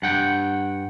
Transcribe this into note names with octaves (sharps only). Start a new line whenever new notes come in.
G2 F#5 G5